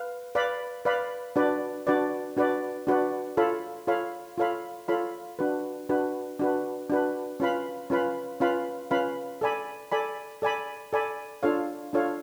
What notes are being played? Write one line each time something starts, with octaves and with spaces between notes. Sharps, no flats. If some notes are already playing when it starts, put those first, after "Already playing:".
Already playing: B4 F5
B4 D5 F5 B5
B4 D5 F5 B5
D4 F#4 B4 D5
D4 F#4 B4 D5
D4 F#4 B4 D5
D4 F#4 B4 D5
F4 A4 C#5 F5 B5
F4 A4 C#5 F5 B5
F4 A4 C#5 F5 B5
F4 A4 C#5 F5 B5
D4 F#4 B4
D4 F#4 B4
D4 F#4 B4
D4 F#4 B4
C#4 F4 B4 F5 B5
C#4 F4 B4 F5 B5
C#4 F4 B4 F5 B5
C#4 F4 B4 F5 B5
A4 D5 G#5 B5
A4 D5 G#5 B5
A4 D5 G#5 B5
A4 D5 G#5 B5
D4 F4 A4 C#5 F5
D4 F4 A4 C#5 F5